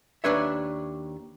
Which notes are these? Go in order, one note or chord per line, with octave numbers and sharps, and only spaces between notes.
D#2 B2 D4 B4 C#5 E5